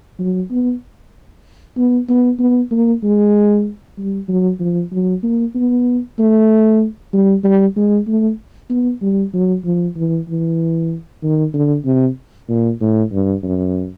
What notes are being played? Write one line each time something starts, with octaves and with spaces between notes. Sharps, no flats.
F#3
B3
B3
B3
B3
A#3
G#3
G3
F#3
F3
F#3
A#3
B3
A3
G3
G3
G#3
A3
B3
G3
F#3
F3
E3
E3
D#3
D3
C3
A#2
A2
G2
F#2